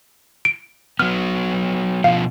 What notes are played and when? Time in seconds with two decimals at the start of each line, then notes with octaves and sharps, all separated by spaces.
0.45 D7
0.99 F#3 B3 F6
2.04 B2 F3 F5